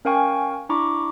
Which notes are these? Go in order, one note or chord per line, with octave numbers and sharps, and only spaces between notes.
C#4 A#4 F5 G5 G#5 C#6
D4 E4 A#5 B5 C#6 D6